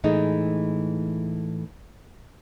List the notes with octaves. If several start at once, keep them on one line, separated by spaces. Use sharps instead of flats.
A2 E3 G#3 A3 D#4